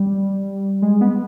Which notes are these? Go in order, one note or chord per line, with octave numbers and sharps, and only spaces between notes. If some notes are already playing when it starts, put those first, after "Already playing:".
Already playing: G3
G#3
B3